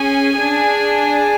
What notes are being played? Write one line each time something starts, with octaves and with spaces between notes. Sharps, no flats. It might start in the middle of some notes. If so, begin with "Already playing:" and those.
Already playing: C#4 G#4 G#5
G#4
D4